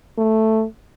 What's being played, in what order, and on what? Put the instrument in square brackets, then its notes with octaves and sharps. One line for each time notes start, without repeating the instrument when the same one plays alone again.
[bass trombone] A3